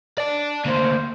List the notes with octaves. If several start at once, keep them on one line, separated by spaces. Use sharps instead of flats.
D5 A5
D2 A#3 C5